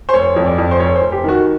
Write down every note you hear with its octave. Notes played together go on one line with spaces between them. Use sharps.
C5
F1 C#5
F2
D5
F2
C5
F1 C#5
C5
F1
G4
D#3 F#4